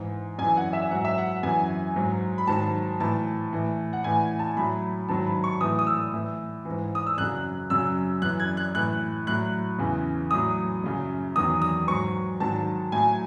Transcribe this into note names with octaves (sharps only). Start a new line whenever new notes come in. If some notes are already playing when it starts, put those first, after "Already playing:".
Already playing: G#2 E3
F#2 E3 G#5
F#5
E5
G#2 F#3 F#5
E5
F#5
F#2 E3 G#5
G#2 F#3
B5
G#2 D#3 F#3 A5
A2 E3 A5
A2 E3
F#5
A2 E3 G#5
A5
A2 F#3 B5
G#2 D#3 F#3 A5
B5
C#6
A2 E3 D#6
D#6
E6
A2 E3
G#2 E3
D#6
E6
F#2 C#3 F#3 F#6
F#2 C#3 F#3 E6
F#2 E3 F#6
G#6
F#6
A2 E3 F#6
A2 F#3 F#6
E2 C#3 E3
A2 F#3 D#6
F#2 C#3 F#3
E2 D#3 F#3 D#6
D#6
G#2 F#3 C#6
G#2 D#3 F#3 A5
A2 F#3 G#5